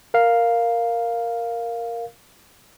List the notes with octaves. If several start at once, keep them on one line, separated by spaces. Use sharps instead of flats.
A#4 F5